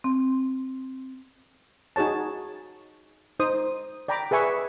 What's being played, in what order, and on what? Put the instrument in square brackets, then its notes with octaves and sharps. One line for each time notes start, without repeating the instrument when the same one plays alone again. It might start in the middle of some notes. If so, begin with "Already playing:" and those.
[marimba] C4
[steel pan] D#4 F#4 G#4 C#5 A5
D#4 C5 D#6
D5 G5 A#5 B5 D6
G#4 B4 E5 G#5 C#6